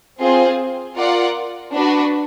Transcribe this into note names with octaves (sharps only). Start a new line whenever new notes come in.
C4 F4 G#4 C5
F4 A#4 D5 F#5
D4 F#4 B4